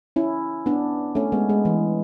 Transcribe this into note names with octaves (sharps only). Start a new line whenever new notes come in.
C#4 E4
B3 D4
A3 C#4
G#3 B3
G#3
E3